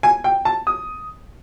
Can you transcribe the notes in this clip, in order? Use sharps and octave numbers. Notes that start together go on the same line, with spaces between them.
G#5
G5
A5
D#6